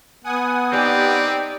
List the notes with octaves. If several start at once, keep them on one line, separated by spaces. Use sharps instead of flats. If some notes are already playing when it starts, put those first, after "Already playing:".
B3 F#5 G#5 D#6
C4 D#4 G4 D5